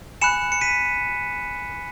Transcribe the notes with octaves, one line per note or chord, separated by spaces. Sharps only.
G#5 B5 F#6 C#7 E7
C#7
B6 D#7